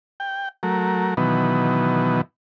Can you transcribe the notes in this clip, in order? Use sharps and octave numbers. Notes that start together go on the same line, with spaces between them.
G5
F#3 A3 A#4
B2 D#3 E3 F#3 B3